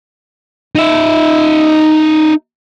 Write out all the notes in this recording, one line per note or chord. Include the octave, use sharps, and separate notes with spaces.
D#4 E5